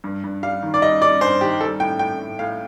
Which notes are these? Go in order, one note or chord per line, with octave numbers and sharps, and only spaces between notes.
G2
G2
G3 F5
D#3
D5
G3 D#5
G3 D5
G2 C5
D#3 G4
G3 A4
A2 G5
A2 G5
A2
A2 F5